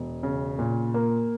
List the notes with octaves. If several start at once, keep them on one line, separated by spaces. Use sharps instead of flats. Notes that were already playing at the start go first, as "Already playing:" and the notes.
Already playing: E1
C#3
A#2
A#3